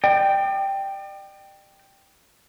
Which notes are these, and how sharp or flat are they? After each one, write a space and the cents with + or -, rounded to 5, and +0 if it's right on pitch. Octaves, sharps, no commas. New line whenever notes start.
D5 +40 G5 +0